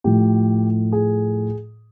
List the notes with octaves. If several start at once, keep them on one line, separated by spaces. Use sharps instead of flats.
A2 F3 A3 G4
G#4